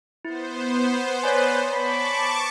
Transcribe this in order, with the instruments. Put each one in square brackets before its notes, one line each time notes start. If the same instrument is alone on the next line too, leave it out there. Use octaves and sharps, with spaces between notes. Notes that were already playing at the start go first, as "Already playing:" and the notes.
[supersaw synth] B3 C5 [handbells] E4
[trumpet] B4 [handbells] C#5 D5 G#5
[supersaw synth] A5 C#6 D6 [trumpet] B5